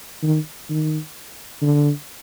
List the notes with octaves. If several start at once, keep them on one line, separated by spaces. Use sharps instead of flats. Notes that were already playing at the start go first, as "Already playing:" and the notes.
D#3
D#3
D3